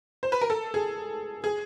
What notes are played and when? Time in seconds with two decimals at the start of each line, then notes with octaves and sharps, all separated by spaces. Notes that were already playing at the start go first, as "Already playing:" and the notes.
0.23 C5
0.32 B4
0.41 A#4
0.50 A4
0.74 G#4
1.44 G#4